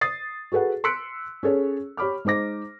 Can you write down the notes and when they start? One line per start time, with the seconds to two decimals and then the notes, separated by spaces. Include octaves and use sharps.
0.01 D#6 A6 C7
0.52 F#4 G#4 A4 B4 F#5
0.84 C6 E6 F#6 B6 C#7 D7
1.43 C#4 G#4 A4 C#5
1.97 G4 C#5 B5 D6 F6
2.25 G#3 D#4 C5 D6 A#6